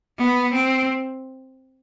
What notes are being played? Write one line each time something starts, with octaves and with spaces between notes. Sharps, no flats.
B3
C4